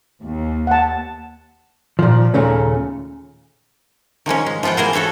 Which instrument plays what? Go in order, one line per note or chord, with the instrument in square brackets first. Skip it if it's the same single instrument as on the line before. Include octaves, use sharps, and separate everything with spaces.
[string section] D#2
[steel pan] F#5 A5
[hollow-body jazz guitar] A#2 D#3 F3
D#2 A#2 C#3 A3 C#4
[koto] D#3 F3 G#3 C#4
G#3
F3 B3 F4 F#5 G5
E3 G#4 A#4 C5
F#4 A4 C#5 E5 F5